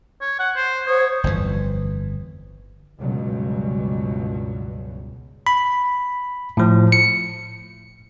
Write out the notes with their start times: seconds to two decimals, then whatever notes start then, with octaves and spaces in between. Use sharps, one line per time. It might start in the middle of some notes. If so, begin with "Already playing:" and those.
0.21 C#5
0.39 F#5
0.56 C5
0.87 C5 C#5 F#5 D#6
1.24 G1 F2 A2 E3
2.99 C#2 G2 B2 F#3
5.47 B5
6.57 A2 F3
6.92 C#7